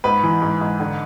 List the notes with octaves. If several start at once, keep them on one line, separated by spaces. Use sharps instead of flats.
G#2 B4
E3
G#2
G#2
D3